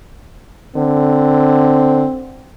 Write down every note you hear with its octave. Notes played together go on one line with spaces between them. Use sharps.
D3 C4